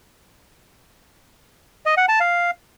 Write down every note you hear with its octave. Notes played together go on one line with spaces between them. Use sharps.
D#5
F#5
A5
F5